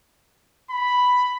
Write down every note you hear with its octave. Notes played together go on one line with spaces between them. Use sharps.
B5